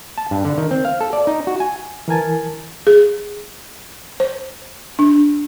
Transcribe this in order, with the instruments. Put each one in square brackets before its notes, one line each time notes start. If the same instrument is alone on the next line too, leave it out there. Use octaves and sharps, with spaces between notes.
[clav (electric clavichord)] A5
G2
D3
D#3
C4
F5
A4
D5
D#4
F#4
G#5
[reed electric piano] E3 A#4 G#5 A5
[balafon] G#4
C5
D4